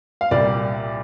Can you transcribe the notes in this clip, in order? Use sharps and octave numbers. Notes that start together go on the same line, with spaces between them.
F5
C2 A#2 G3 D5